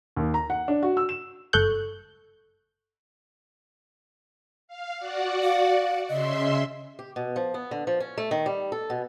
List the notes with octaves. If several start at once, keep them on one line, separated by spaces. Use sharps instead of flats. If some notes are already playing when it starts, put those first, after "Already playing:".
D#2
A#5
F#5
D4
F#4
E6
E7
G1 A4 C#6 F#6 G6
F5
F#4 D5 F#5
F5
C#3 D#5 E5 C6
G4
B2
F3
B3
D3
F3
C#4
A3
D#3
G3
A4
B2